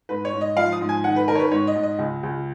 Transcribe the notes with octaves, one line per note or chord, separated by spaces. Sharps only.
G#2 B4
C#5
G#2
D#5
F3 F5
D#6
G#2
G#5
D#3 F#5
B4
D#3 A#4
C#5
B4
G#2 C#5
D#5
G#2
D#5
C#2
C#2